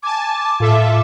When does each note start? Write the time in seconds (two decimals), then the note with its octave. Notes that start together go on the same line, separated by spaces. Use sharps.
0.03 G#5 A5 D6
0.60 A2 F4 A4 E5